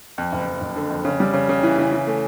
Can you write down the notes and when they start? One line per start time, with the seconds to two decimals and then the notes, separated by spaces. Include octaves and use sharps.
0.18 F2
0.33 F#1
0.47 F2
0.61 F#1
0.76 D3
0.90 F2
1.05 C#3
1.20 G3
1.34 C#3
1.49 C#3
1.63 E3
1.78 C#3
1.92 E3
2.07 A3